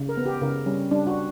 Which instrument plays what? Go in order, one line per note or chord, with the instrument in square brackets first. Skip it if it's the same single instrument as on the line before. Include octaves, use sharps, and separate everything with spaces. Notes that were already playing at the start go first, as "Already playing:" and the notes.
Already playing: [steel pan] C#3
A#4
B3
G4
C#3 A#4
G3 C#4
G3 D4
F#4